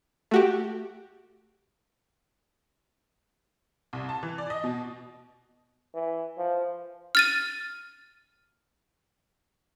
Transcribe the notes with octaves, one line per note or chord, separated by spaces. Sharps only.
A3 F#4 G4
C2
A5
E3
D5
D#5
B2
E3
F3
F6 A6 D#7